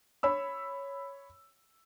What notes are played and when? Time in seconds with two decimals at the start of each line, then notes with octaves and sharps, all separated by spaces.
0.23 C#5 B5 E6